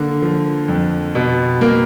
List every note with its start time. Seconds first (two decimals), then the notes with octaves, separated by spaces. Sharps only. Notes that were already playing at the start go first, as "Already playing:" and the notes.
Already playing: D3 A#3
0.22 F3
0.68 F2
1.15 B2
1.61 A#3